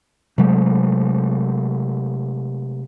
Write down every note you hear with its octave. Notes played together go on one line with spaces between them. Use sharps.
C3 F#3 G#3 A3